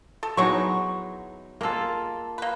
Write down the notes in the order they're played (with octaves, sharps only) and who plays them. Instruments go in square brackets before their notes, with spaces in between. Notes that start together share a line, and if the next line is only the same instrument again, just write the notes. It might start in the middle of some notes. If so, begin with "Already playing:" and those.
[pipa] A4
[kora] F#3 B3 D#4 [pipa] G#3 E4 C#6
[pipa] G#3 A4 [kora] A#3 F4
[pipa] A#3 B4